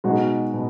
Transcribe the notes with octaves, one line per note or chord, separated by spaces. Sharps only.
B2 G#3 D#4 F#4
B2